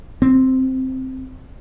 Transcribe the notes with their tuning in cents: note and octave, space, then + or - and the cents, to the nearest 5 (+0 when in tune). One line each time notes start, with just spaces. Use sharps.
C4 +0